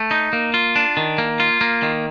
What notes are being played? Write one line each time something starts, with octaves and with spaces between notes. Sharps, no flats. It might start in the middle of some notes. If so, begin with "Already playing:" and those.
Already playing: A3
D#4
A#3
F4
D4
D#3
A#3
F4
A#3
D#3